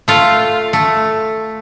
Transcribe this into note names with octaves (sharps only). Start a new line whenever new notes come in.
A3 F4
A3